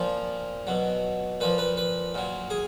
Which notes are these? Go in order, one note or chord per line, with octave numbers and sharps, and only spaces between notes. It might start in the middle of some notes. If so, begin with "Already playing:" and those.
Already playing: A#2 F3
B2 F#3
A#2 F3 B4
B4
B4
A#2 F#3
G#4